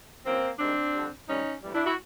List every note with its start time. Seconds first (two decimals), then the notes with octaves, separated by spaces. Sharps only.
0.25 F#2 C#3 E3 A#3 C4
0.59 G#2 D#3 G3 C4 D4
0.93 F2 D3 G3
1.28 D2 C3 D#3 G3 C#4 D#4
1.62 D2 C3 E3 G3
1.74 D4 E4
1.85 E4 F#4